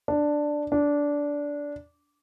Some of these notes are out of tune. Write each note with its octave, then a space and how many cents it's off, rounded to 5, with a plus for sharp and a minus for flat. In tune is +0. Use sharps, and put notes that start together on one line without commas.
D4 +5
D4 -15